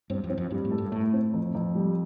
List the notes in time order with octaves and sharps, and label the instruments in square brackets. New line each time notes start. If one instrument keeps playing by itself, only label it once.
[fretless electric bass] G2 [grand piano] C4
[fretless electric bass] F2
[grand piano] C4
[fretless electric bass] F2
[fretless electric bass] G2 [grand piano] G3
[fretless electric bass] A2
[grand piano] A4
[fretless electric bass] G2
[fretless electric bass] A2 [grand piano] A3
[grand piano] C4
F2
F2
G3